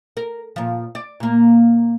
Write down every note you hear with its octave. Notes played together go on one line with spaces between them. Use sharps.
A#4
A#2 F3
D5
A#2 A#3